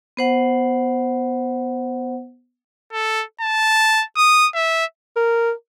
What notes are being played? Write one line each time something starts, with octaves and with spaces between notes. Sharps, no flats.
B3 C5 F#5
A4
A5
D#6
E5
A#4